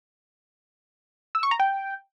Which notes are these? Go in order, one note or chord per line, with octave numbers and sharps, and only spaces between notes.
E6
C#6
A#5
G5